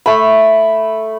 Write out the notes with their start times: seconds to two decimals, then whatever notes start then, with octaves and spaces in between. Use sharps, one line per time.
0.06 A3 B5